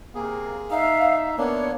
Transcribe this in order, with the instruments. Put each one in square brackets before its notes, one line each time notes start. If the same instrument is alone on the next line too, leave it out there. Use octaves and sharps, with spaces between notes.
[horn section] C3 A#3 [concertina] G#4
[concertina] D#4 [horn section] E5 [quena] F5
[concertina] A#3 D4 [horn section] B3 [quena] C#5